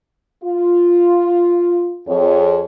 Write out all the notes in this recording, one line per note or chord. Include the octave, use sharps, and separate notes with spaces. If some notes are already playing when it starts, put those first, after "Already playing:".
F4
F2 G#4 C#5